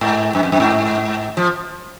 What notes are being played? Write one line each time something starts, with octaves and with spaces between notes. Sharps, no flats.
G#2
F#2
F2
F#2
G#2
F3